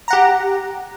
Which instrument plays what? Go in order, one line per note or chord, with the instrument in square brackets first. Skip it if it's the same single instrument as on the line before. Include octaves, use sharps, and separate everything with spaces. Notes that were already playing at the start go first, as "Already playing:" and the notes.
[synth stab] A#5
F#5
G4